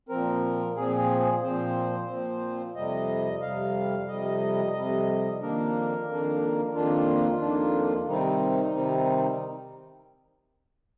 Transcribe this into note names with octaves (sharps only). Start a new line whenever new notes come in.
A#2 F3 C4 A#4
A#2 F3 C4 G#4
A#2 F3 C4 C5
A#2 F3 C4
F2 C3 G3 D#5
F2 C3 G3 F5
F2 C3 G3 D#5
F2 C3 G3
F2 D#3 A#3 D4 A#4
F2 D#3 A#3 D4
F2 D#3 A#3 D4 F4
F2 D#3 A#3 D4
C3 D#3 G3 C4 D#4
C3 D#3 G3 C4